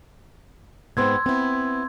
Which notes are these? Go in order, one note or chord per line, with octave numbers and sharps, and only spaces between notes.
G#2 B3 C4 C6 E6 G#6
B3 C4 E4